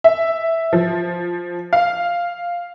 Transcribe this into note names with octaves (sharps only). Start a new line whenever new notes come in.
E5
F3
F5